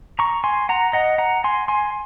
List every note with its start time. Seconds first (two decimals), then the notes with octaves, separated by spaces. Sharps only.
0.19 A#5 C#6
0.44 G#5 C6
0.69 F#5 A#5
0.93 D#5 F#5
1.18 F#5 A#5
1.44 G#5 C6
1.68 G#5 C6